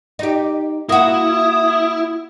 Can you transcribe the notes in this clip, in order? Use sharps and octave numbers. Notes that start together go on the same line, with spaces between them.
D#4 G4
A#3 E4 F#4 D#6